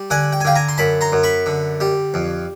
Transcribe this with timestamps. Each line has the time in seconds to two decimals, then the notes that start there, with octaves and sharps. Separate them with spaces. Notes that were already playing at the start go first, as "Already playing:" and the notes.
Already playing: G3
0.10 D3 F#5 G#5
0.33 G5
0.41 G#5
0.45 D3 F5 G5
0.55 G#5 A#5
0.69 C6
0.78 F#2 A5 B5
1.01 A#5 C6
1.12 F#2
1.23 B5 C#6
1.46 D3
1.80 G3
2.14 F2